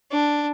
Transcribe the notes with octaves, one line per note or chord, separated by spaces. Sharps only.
D4